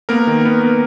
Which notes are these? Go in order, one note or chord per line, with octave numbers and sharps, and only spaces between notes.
A#3 B3 A#4
D#3
B3
B3